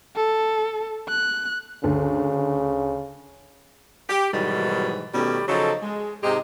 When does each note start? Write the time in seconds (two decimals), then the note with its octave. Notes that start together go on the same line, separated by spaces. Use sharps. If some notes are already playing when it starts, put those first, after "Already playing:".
0.16 A4
1.08 F#6
1.84 D2 C#3
4.10 G4
4.34 G#2 B2 D#3 E3 F#3 G3
5.14 B2 D#3 G3 A3 C#4
5.48 C#3 F3 F#3 D#4 A4
5.82 G#3
6.23 G#2 C3 G#3 D#4 G4